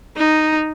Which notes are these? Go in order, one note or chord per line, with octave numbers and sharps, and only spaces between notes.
D#4